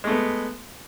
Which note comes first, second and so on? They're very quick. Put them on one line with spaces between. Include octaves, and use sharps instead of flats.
G#3 A3 B3